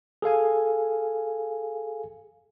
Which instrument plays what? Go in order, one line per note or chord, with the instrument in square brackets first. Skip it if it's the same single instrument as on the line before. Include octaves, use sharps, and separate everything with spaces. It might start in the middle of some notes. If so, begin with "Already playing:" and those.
[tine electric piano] G#4 A4 F5 G#5